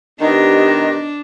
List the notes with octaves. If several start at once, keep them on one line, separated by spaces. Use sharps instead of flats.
D#3 B3 D4 G4 D#5